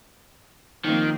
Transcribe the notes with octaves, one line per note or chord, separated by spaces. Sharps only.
D#3 F3 A#3 C4